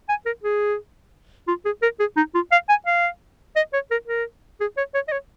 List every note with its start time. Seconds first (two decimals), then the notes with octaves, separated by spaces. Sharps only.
0.09 G#5
0.26 A#4
0.44 G#4
1.48 F4
1.65 G#4
1.82 A#4
2.00 G#4
2.16 D#4
2.35 F4
2.52 F5
2.69 G#5
2.86 F5
3.56 D#5
3.73 C#5
3.91 A#4
4.08 A#4
4.60 G#4
4.77 C#5
4.94 C#5
5.08 D#5
5.12 C#5